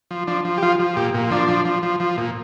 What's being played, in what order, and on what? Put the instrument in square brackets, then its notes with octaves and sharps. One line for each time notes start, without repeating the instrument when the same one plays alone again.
[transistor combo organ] F3
F3 D4
F3
G4
F3 F4
F3
A#2 G4
A#2
F3 D4
F3
F3
F3
F3
A#2